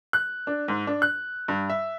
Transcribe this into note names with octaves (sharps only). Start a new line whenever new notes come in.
F#6
D4
G#2
D4
F#6
G2
E5